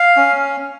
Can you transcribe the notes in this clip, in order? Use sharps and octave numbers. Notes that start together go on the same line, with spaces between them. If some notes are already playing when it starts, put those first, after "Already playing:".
Already playing: F5
C#4